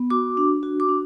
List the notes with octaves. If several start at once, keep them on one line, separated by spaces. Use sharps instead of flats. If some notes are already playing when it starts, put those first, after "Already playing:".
Already playing: B3
F#4 D6
D4
F#4
D6
D4